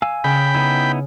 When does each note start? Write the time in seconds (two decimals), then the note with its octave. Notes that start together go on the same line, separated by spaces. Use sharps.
0.02 F5 G#5 E6
0.24 C#3 G5 B5
0.55 B3 D#4 E4